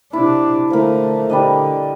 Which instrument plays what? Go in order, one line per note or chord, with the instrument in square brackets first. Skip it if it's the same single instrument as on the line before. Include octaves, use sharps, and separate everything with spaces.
[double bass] C3 D4 [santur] E4
[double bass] D3 A3 [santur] F3 A#4
[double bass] D3 [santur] G3 D4 D#5